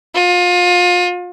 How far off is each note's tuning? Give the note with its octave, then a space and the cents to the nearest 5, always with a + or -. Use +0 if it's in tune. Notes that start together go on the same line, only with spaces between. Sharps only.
F4 +30